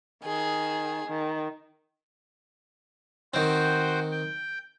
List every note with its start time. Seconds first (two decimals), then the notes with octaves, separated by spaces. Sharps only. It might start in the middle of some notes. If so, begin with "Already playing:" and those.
0.25 D#3 G#4
1.08 D#3
3.34 D#3 C4 F#4 C5 G5
4.11 G5